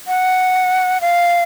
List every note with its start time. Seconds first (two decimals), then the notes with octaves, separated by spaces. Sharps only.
0.07 F#5
1.01 F5